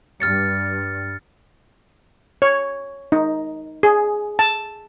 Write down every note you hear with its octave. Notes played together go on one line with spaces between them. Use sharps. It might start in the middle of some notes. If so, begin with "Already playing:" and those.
G2 F6 A6 C#7
C#5
D#4
G#4
A5